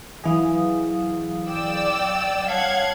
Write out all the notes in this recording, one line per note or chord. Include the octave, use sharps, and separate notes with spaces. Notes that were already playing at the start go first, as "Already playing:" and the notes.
E3 F#3 G#4 F5 D#6
D5 G5 E6
G3 C#5 F5 F#5 A5 G#6